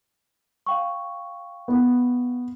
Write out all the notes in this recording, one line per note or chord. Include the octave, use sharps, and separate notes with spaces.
F5 G5 C#6
B3